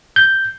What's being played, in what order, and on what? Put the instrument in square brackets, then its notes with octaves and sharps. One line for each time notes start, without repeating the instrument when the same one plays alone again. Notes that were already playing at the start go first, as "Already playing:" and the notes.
[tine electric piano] G6